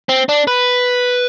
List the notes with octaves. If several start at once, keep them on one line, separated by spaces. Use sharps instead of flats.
C4
D4
B4